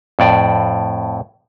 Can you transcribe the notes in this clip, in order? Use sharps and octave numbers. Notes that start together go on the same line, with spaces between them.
F2 A2 D5